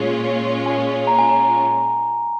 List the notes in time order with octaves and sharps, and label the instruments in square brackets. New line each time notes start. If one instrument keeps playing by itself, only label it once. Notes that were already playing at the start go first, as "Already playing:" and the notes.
Already playing: [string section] A#2 G#3 C#4 F4
[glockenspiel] G#5
A#5
G#5
A#5